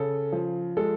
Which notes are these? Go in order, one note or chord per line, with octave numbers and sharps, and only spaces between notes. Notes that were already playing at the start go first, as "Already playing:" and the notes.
Already playing: C#3 A4
F3
G#3 A4